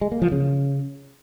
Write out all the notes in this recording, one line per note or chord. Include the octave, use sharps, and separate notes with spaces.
G#3
A#3
F3
C#3